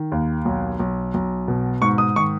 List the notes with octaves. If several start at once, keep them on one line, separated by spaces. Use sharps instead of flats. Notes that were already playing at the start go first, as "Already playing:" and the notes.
Already playing: D#3
D#2
B1
B1
B1
B2
G#2 C#6
D#6
D#3 C#6